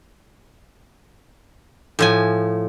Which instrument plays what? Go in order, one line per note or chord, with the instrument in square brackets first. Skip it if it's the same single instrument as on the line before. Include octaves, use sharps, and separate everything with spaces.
[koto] A2 F3 G#5